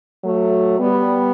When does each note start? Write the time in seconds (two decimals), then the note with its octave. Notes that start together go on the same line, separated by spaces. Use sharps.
0.25 F#3 A3
0.79 G3 B3